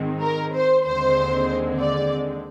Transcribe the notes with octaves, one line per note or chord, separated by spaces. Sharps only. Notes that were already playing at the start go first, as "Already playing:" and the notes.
Already playing: G#2 D#3 G#3 C4
A#4
C5
D#2 D3 G#3 C4 C5
D5